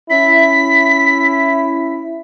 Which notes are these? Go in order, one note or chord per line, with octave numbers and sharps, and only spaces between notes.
C#4 E4 B6